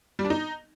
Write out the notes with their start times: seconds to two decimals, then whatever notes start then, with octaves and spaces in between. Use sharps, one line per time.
0.19 G3
0.25 D4
0.30 D#4